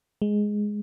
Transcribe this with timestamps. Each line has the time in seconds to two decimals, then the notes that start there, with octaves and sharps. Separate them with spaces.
0.22 G#3